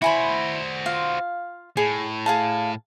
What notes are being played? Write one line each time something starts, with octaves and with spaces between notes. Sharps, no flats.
E4 F#4 C5 G#5 B5
F4 F5
A2 G#4
G#4 F5 A5